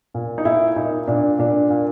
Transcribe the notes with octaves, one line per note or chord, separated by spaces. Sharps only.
A#2
D#4
A#2 E4
A#2 D#4
A#2 D4
A#2 D4
A#2